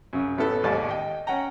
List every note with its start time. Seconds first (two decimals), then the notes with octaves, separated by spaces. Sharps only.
0.13 F#2 C#3
0.37 A1 B3 E4 A4
0.63 A1 D#2 G#2 D5 D#5 A5
0.89 D#5 G5
1.27 C#4 F#5 G5 A#5